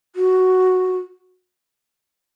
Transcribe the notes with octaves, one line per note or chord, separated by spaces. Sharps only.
F#4